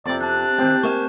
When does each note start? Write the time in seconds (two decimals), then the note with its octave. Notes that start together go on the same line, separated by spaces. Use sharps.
0.06 F2 C3 D5 D6
0.21 D4 A5 F#6
0.58 D#3 C4 G4 F#6 G6
0.83 A#3 E5 G#5 C#6 E7